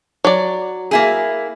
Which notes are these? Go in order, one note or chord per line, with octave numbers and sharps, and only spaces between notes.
F#3 D5
A#3 E4 G#4